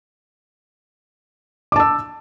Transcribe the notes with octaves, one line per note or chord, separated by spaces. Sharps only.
A5 D6 E6